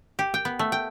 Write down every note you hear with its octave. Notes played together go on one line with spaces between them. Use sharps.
G4
G5
B3
A3
G5